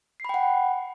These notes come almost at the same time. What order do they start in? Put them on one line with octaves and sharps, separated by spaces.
C7 B5 G5 F#5